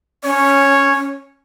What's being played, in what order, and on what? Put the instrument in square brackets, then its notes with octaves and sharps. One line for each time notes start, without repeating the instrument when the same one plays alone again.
[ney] C#4 [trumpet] C#5